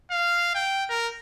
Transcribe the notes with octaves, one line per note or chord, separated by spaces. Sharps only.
F5
G5
A#4